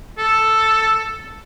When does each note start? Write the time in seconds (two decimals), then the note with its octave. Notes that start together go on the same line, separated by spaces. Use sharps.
0.18 A4